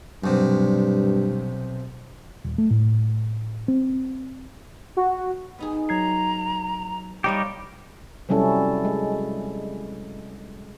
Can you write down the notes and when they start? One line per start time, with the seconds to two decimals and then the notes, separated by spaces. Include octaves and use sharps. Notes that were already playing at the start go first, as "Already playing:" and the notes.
0.24 B1 G2 C3
2.44 D#1
2.58 A3
2.71 A2
3.68 C4
4.97 F#4
5.59 B3 D#4 G#4
5.89 F#3 A#5 G#6 C7
7.24 G3 D#4 G4 C#5 D#5 F5
8.29 C3 F#3 G3 C#4 E4 A4
8.85 G#3